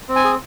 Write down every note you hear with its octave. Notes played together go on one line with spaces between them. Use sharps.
C4
G#5
G#4